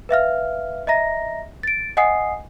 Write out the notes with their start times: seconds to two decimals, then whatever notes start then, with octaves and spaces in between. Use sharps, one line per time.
0.09 B4 E5 F5 F6
0.87 D#5 E5 A#5 A#6
1.63 A6 D7
1.97 D#5 F#5 G#5 D#6 C7